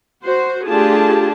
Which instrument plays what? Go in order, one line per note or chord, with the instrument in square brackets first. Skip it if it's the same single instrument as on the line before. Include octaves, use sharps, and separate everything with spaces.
[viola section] F#4 C5
A3 D4 F4 G4 G#4 A5